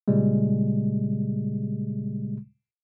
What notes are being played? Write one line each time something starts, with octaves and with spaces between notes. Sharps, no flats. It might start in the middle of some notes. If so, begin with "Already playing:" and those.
A#2 C#3 G3 G#3